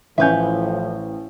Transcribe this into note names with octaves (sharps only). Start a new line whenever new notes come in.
A1 A2 F3 C#4 B4 E5 F5 G6